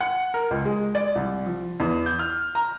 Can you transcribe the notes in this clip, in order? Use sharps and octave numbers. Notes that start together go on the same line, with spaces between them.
F#5
A#4
C#2
G#3
D5
C2
F3
E2
G6
F6
A#5